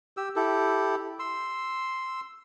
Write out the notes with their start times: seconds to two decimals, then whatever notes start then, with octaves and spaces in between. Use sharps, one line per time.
0.17 G4 E6
0.36 E4 G4 A4
1.19 C6 E6